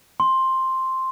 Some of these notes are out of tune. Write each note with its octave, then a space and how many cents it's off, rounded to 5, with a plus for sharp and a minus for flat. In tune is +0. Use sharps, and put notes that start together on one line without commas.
C6 +5